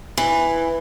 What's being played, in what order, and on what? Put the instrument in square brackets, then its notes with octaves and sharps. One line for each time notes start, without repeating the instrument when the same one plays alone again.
[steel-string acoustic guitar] E3